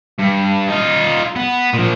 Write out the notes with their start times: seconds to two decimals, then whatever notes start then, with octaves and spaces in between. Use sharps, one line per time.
0.19 G2
0.68 D#4 F4
1.36 B3
1.74 A#2 F3